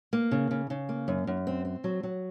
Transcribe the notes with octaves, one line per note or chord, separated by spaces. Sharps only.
A#3
C#3
C#3
C#3
A#3
F#2
F#2
C4
C4
F#3
F#3